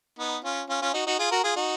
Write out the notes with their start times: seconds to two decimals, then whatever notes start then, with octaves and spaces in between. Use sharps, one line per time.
0.19 B3 D#4
0.44 C#4 F4
0.69 C#4 F4
0.82 C#4 F4
0.94 D#4 F#4
1.06 D#4 F#4
1.19 F4 G#4
1.31 F#4 A#4
1.44 F4 G#4
1.56 D#4 F#4